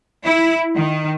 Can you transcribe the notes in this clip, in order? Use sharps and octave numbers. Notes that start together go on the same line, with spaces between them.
E4
D#3